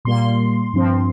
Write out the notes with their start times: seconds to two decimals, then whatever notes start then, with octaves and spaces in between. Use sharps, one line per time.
0.05 A#2 G3 A#3 C6
0.73 G2 F3 C4